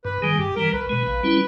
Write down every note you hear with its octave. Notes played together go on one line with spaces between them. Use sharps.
G2 B4
D#3 G3 G#4
G2 G4
E3 G3 A#4
C#2 B4
B2 G#3 B4
A#1
G3 C#4 E4